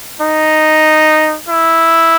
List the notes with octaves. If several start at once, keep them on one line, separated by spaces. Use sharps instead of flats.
D#4
E4